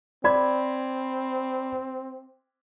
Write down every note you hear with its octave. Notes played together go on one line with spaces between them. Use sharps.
C4 D5 B5 G#6